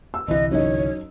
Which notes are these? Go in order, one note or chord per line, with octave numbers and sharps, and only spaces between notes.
E6
G1 C2 E3 D#5
F#2 D#4 C#5 D#5